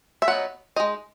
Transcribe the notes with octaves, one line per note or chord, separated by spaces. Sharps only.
E5
F#3 B3 D#4 F#5
G#3 D#4 D#5